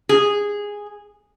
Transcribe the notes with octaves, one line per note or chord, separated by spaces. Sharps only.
G#4